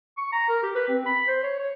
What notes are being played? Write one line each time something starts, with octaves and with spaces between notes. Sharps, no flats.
C#6
A#5
A#4
G4
B4
C4
B5
C5
C#5
C#5